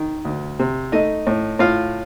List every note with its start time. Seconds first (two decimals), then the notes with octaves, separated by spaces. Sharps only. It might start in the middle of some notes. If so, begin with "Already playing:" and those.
Already playing: D#3
0.25 D2
0.59 C3
0.92 A3 D#4 D#5
1.27 A2
1.59 A2 F4 F5